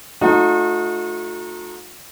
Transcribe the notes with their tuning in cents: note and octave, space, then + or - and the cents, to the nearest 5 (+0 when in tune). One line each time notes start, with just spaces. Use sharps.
A3 +0 D#4 +0 F#4 -45